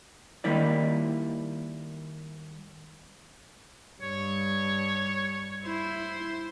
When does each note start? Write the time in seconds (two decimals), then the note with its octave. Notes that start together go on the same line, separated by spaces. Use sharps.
0.44 D#3 G3 A#3 E4 D5
4.02 G2 C#5
5.65 E4 C5